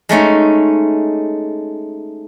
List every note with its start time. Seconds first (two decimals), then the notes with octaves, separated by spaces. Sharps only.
0.09 G#3 A3 C#4 D#4